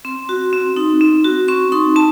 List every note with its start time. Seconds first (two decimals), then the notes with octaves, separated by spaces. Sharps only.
0.05 C4 C6
0.29 F#4
0.53 C4
0.76 D#4
1.01 C4
1.24 F#4
1.48 C4 C#6
1.72 D#4 C6
1.96 C4 A5